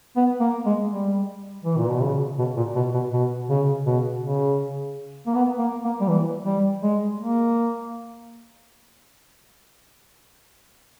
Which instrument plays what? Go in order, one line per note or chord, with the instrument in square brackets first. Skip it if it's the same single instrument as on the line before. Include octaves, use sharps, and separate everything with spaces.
[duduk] B3
A#3
G#3
G3
E3
A#2
B2
C#3
B2
A#2
B2
B2
B2
C#3
B2
C#3
A#3
B3
A#3
A#3
G3
E3
G3
G#3
A#3